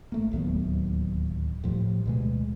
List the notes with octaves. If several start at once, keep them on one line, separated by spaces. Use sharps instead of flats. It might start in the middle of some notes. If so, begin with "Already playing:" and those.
A1 A3 A#3
D1 D#2 F#3 B3
A2 F3 G3
D2 B2 G#3